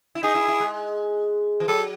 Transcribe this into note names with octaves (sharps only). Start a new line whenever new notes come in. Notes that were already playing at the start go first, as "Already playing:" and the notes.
E4
D#4 G#4
E4
E4
G#3
E3
F#3 A4